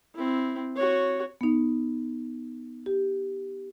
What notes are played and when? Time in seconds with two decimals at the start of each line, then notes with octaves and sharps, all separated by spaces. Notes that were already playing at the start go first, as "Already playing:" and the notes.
0.15 C4 E4
0.76 F#4 C#5
1.41 B3 D#4
2.86 G4